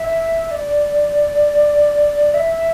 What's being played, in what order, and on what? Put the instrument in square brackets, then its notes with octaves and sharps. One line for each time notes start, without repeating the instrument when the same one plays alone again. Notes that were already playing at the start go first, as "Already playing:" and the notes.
Already playing: [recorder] E5
D5
E5